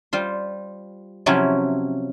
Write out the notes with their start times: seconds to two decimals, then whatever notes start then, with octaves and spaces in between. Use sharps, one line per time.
0.13 G3 F4 C5
1.26 C3 F3 F#3 C#4 E4 F4